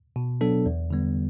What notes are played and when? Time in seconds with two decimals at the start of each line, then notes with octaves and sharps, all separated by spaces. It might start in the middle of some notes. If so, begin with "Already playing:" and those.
0.16 B2
0.41 F#3 B3 D4 A4
0.66 E2
0.91 D3 G3 B3